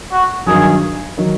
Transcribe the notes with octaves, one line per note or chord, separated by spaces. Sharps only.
F#4
G2 D#3 F#3 G#4
D#3 F#3